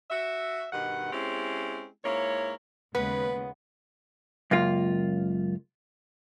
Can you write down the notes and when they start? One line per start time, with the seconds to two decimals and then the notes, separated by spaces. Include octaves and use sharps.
0.10 F#4 E5
0.73 G2 B2 D#3 F#5
1.12 G#3 C4 C#4 E4 G4
2.04 G#2 A#3 E4 C#5
2.95 D#2 C#3 G#3 B3 B4
4.51 C#2 F#2 A#3 F4